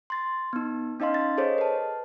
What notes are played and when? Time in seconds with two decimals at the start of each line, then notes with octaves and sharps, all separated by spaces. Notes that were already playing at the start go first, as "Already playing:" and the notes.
0.10 C6 A6
0.53 B3 D#4
1.00 C#4 D#4 D#5 F5 C6
1.14 A6
1.38 G#4 A4 C5 C#5 D#5
1.58 B4 A5